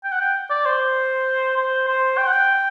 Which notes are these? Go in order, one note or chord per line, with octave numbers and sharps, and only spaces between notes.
G5
F#5
G5
D5
C5
C5
C5
G5
F#5
G5